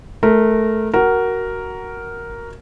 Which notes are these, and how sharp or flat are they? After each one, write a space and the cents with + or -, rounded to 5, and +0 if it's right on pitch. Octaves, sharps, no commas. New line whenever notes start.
A3 -20 A#4 -10
F#4 +15 A#4 +0